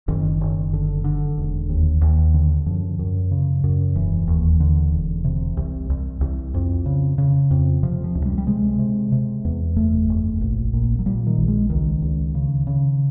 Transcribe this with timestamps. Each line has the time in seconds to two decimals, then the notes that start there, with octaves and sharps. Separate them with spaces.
0.08 F#1 D#3
0.41 F#1
0.73 D3
1.04 D3
1.37 E1
1.69 D#2
2.02 D#2
2.34 D3
2.66 F#2 F3
2.99 F#2
3.31 C#3
3.64 F#2
3.95 E1 E3
4.28 D#2
4.60 D3
4.92 E1
5.24 C3
5.57 C2
5.90 C2
6.21 C2
6.54 F2
6.86 C#3
7.18 C#3
7.51 F2
7.83 C3 F3
8.04 F3
8.15 C#2
8.25 G3
8.38 G3
8.47 C3 G#3
8.79 C3
9.12 C3
9.45 E2
9.76 F#1 A3
10.09 F#1
10.41 A#1
10.74 A#2
10.99 F#3
11.06 A#2 G3
11.27 D#3
11.38 A#1
11.48 G#3
11.70 C#2 D#3
12.02 C#2
12.35 C#3
12.67 C#3